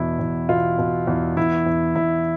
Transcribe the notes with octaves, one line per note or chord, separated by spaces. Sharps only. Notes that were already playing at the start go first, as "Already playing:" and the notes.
Already playing: E2 B2 E4
E2
B2 F4
B2
E2
E2 E4
E2
E2 E4